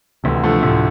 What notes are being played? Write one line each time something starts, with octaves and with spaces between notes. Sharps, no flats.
D2 C3 E3
D3 F3 A3
D2 A2 C3